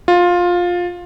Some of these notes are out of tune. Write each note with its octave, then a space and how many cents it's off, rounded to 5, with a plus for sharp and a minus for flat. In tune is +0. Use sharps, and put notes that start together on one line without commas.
F4 +15